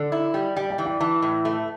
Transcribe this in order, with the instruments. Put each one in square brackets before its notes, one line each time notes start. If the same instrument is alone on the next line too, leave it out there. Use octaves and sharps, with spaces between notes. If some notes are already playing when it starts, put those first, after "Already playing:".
Already playing: [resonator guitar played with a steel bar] D3 [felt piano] A4 D5
[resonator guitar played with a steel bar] E4
G3
[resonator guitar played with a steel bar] G3 [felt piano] D5 G5
[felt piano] D5 G5
[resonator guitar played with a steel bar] E3
[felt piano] D5 G5
[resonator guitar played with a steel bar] E3 [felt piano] E5 A5
[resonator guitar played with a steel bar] A2
A3